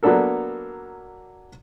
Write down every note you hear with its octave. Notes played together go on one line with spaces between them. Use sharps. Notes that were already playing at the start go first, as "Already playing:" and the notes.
F#3 A#3 B3 D4 A4 A#4